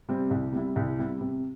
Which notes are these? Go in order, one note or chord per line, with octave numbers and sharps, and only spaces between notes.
C3 G3 C4
C2
C3 G3 E4
C2
C3 G3 E4
C3